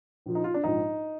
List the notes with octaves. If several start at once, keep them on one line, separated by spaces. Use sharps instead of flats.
A#1 A#2 F3
D#4
F4
D4
A#1 G#2 F3 D#4